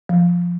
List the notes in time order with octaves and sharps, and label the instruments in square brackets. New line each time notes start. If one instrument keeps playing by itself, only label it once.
[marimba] F3